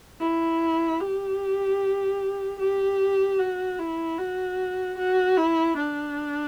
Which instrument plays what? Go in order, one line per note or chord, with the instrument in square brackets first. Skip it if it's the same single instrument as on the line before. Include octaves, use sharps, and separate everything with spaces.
[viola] E4
G4
G4
F#4
E4
F#4
F#4
E4
D4